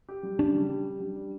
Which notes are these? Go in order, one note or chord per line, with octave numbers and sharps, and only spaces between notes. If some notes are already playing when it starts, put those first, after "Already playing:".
G4
G3
C#3 D4
G3
G4
D4
G3
D4